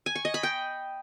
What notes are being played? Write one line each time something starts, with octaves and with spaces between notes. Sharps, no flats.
G#5
C#6
D#5
B5
G5